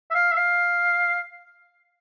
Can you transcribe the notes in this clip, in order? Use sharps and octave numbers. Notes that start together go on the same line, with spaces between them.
E5
F5
E5
F5